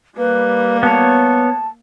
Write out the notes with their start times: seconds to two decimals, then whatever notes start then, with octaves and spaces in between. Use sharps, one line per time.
0.18 G3 A#3 B4
0.83 B3 C#5 A5